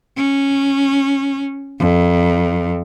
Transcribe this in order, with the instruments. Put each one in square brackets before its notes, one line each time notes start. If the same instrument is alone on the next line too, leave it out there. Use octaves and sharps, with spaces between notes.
[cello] C#4
F2